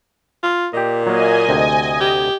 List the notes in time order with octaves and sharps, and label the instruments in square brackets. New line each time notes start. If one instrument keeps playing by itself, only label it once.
[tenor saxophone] F4
[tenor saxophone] A#2 [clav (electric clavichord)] G4 D#5
[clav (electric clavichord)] F#3 A#3 [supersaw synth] D#5 G#5
[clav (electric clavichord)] D2 C3
[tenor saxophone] G4